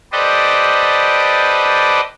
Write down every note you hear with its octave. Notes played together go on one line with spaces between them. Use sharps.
G4 A4 B4 C5 D5 D#5